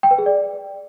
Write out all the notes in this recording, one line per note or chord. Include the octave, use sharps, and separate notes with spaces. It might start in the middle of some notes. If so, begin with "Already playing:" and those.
G5
B4
G#4
D5